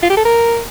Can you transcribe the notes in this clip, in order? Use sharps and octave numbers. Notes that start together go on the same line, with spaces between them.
F4
G4
A4
A#4